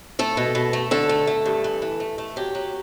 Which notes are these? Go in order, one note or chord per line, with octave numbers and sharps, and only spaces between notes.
A3 A4
B2
B2
A3
D3 A4
A3
A3
G2
E3
E3
A3
A3
F#3 G4
F#3